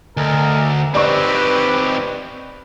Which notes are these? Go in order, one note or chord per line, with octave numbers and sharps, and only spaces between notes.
D2 A4 A#4 D#5
C4 D#4 G4 B4 D5 C#6